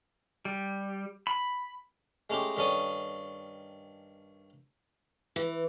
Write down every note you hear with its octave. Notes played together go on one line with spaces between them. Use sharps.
G3
B5
G#3 A3 C#4 D#4 G4
G2 D#3 C#4 A4 C#5 D#6
E3